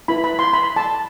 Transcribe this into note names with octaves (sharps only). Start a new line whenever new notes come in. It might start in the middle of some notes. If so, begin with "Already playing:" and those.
E4 B4 B5
B5
C6
B5
A5